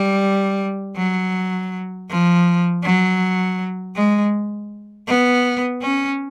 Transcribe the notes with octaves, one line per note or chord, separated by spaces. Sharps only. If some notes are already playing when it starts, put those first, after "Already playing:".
Already playing: G3
F#3
F3
F#3
G#3
B3
C#4